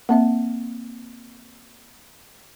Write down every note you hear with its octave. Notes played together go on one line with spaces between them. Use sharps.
A#3 C4 E5